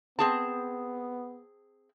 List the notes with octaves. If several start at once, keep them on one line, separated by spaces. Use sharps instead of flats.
B3 C4 G#4 A5